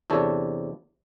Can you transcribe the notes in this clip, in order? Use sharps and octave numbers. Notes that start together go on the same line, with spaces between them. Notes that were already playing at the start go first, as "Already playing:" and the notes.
E2 C3 D4 A4 C#5